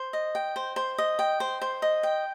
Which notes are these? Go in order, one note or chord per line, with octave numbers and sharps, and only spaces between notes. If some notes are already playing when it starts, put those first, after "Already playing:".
Already playing: C5
D#5
G5
C5
C5
D#5
G5
C5
C5
D#5
G5